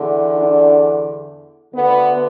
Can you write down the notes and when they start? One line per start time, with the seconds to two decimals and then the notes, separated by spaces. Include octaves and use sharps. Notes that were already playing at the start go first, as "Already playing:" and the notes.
Already playing: E2 D3
0.38 D4
1.74 D2 D3 B3